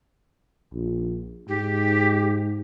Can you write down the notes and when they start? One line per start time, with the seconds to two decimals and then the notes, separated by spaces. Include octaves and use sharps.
0.72 A#1
1.49 G#2 G4